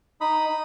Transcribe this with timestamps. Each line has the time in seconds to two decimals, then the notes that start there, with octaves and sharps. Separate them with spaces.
0.21 D#4 B5 D#6
0.49 D#4